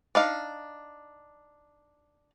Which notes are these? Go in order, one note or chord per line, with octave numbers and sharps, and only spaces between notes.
D4 D#4 F5